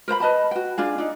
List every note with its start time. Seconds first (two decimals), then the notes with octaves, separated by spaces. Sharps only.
0.08 A#4 C5 A#5 B5
0.20 B4 D#5 A5 B5
0.51 F#4 G5
0.78 D4 F4 G#4
0.98 D4 D#4